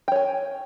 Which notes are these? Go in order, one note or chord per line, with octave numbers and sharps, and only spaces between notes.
C#5 G5 G#5